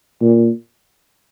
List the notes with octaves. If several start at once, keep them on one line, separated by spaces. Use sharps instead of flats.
A#2